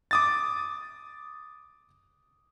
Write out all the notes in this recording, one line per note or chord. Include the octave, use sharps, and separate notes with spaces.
D6 D#6 A6